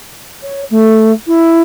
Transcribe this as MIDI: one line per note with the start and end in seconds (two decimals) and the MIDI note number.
0.43 0.62 73
0.70 1.12 57
1.27 1.62 64